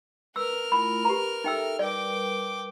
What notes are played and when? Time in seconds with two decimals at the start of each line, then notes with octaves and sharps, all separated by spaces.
0.36 A#4 B4 A#5 E6 F6
0.72 A3 E4 F4 B5
1.05 G4 B4 A#5
1.44 D#4 A4 E5 G5 E6
1.79 G3 A#4 B4 D5 G5 D6